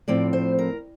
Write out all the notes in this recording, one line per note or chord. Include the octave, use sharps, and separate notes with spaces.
A2 F3 C4 D5
C5
A#4